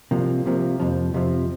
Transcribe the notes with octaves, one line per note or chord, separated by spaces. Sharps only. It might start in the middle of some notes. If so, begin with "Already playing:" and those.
C2 C3 F3 A#3
C2 C3 F3 A#3
F2 C3 F3
F2 C3 F3